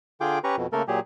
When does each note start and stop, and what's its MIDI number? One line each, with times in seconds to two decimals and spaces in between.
0.21 0.39 50
0.21 0.39 65
0.21 0.39 68
0.21 0.39 79
0.21 0.39 86
0.44 0.56 61
0.44 0.56 67
0.44 0.56 71
0.44 0.56 82
0.44 0.56 85
0.57 0.67 41
0.57 0.67 47
0.73 0.82 49
0.73 0.82 57
0.73 0.82 58
0.73 0.82 69
0.73 0.82 70
0.88 1.00 46
0.88 1.00 54
0.88 1.00 67
0.88 1.00 68